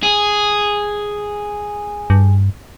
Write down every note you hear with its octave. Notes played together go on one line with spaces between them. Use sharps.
G#4
G2